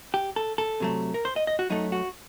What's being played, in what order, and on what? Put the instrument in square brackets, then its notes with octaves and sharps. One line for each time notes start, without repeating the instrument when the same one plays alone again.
[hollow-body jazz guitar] G4
A4
A4
C3 F#3 A3
A#4
C5
D#5
D#5
F#4
F#2 F#3 A3 D#4
F#4